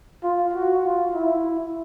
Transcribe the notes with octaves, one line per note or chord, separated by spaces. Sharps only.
F4
F#4
F4
E4